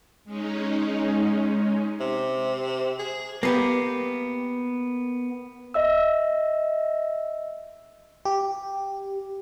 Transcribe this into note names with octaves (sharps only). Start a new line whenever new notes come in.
G#3 C#4 D#4
C3
G#4
A#3 B3 G4
D#5 E5 E6
G4